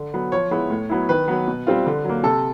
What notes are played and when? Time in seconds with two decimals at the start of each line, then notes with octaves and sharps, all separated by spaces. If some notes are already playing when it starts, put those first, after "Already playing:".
Already playing: D3
0.14 F#3 B3
0.32 F3 C#5
0.51 G#3 B3 E4
0.70 A2
0.89 F#3 B3 E4
1.09 D#3 B4
1.28 F#3 B3
1.48 B2
1.67 G3 C4 F4
1.86 D3
2.05 F#3 A#3
2.23 C3 A4